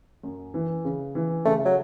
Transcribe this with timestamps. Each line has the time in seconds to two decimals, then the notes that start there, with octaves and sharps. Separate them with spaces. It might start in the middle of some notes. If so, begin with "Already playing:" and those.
0.23 F#2
0.54 E3
0.84 C#3
1.15 E3
1.45 C#3 A3
1.66 F#3